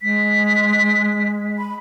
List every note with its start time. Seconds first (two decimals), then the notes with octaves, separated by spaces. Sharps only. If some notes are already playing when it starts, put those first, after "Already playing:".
0.01 G#3 B6
1.58 B5